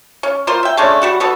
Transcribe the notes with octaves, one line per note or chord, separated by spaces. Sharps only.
C#4
A#3 F4 C5
E5 G5
G#3 A3 C#4 D4
G3 F#4 F#5
G3 B3 F#4 A4